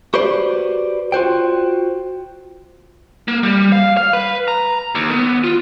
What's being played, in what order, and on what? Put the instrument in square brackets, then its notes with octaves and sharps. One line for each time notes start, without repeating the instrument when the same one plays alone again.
[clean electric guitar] F#4 G4 B4 C5 D5
F4 F#4 C5 G5
[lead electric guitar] A#3
G3
F5
F5
B4
A#5
D#2
B3
F4